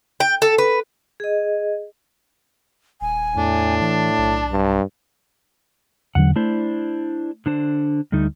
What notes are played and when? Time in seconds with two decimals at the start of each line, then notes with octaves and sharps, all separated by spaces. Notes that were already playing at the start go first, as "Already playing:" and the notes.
0.20 G5
0.42 A4
0.58 B4
1.20 G#4 D#5
3.01 D#1 G#5
3.36 E2 A2 D4
3.81 E3 A5
4.18 B1
4.51 G2
6.15 E2 D3 F#3 F#5
6.36 A3 D4 E4 C5
7.46 D3 D4 C5
8.12 D2 G3 A3 D#4